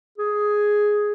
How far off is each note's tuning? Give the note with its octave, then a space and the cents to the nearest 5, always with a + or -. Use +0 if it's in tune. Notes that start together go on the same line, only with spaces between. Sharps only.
G#4 +5